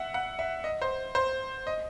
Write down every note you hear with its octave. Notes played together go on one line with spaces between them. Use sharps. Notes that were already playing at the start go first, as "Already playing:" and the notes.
Already playing: E5 F#5
F#5
E5
D#5
C5
C5
D#5